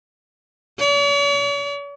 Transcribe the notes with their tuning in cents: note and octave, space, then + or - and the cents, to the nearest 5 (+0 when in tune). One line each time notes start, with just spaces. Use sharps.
C#5 +45